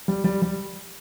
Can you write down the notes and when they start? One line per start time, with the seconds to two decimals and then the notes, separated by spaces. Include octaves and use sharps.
0.08 G3
0.24 G3
0.42 G3